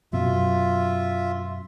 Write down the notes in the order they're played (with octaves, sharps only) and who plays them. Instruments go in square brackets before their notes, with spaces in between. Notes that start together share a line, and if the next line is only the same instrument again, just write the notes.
[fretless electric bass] F#2 B2 [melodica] F4 E5